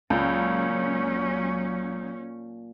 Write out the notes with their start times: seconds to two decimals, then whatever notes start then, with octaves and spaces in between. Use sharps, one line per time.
0.10 C#2 A#2 F#3 C#4 A5